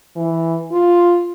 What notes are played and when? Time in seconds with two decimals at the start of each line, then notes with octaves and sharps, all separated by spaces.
0.16 E3
0.72 F4